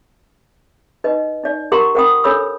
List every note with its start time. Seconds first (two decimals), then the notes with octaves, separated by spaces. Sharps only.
1.04 D#4 B4 D#5
1.43 D#4 D5
1.72 G4 A#4 F#5 A#5 C6 C#6
1.95 A#4 C5 F#5 G5 B5 D#6
2.24 D4 A4 C#5 B5 E6